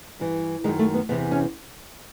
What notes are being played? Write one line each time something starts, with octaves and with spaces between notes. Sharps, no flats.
G2 E3
F#2 D#3 G#3
A3
B3
E2 C3 E3 B3
C#4